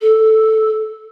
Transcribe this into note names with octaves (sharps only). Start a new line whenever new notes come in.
A4